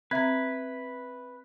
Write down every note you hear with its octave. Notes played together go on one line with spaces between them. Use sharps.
C4 B4 E5 A#5 G#6